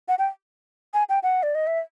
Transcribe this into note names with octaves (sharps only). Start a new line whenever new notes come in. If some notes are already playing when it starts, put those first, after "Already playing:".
F#5
G5
G#5
G5
F#5
D5
D#5
E5